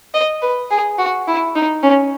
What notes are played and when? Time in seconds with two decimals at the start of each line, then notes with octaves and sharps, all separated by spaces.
0.14 D#5
0.42 B4
0.71 G#4
0.98 F#4
1.27 E4
1.55 D#4
1.83 C#4